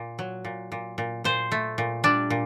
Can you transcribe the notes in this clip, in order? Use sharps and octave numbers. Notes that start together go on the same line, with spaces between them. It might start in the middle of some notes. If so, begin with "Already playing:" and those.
Already playing: A#2
F#3
A#2
A#2
A#2
A#2 C5
A3
A#2
G3 D4
A#2